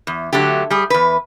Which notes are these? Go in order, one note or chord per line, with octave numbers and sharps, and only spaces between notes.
E2
D3 F#3 A3 G4
G3 G#4
E2 B4